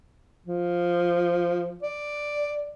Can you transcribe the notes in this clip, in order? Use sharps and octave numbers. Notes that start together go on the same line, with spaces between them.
F3
D5